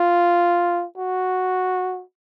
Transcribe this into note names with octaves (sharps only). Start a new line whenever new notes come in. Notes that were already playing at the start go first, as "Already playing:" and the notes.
Already playing: F4
F#4